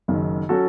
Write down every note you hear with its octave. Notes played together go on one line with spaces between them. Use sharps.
F#1 F#2 D#3
F#3 C#4 F#4 A4